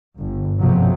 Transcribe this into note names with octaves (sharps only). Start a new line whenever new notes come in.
G1
F#1 B1 C3 F3 F#3